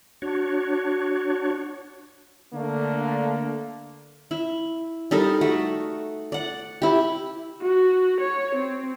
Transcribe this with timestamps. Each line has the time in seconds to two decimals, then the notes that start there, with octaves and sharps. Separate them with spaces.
0.22 D4 F#4 C#5
2.54 D3 A3 A#3 D4
4.31 E4
5.11 G3 D#4 A4 A#4
5.41 A3 F#4
6.32 D5 F#5
6.82 E4 G4
7.62 F#4
8.20 C#5
8.55 C4